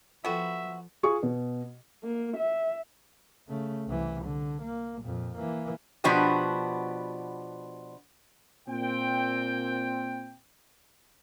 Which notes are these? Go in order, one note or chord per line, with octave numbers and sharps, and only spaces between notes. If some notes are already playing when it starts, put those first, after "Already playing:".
F3 B3 F4 F#4 A4 E5 G5
F4 G#4 C#6
B2
A#3
E5
C#3 A3
C2 E3
D3
A#3
F2 A#2
E3 A#3
B2 F3 B3 D4 F#4 G4
A#2 C4 G5